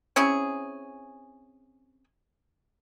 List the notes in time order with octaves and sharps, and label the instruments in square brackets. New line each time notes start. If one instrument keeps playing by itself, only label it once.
[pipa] C4 C#4 E4 G#4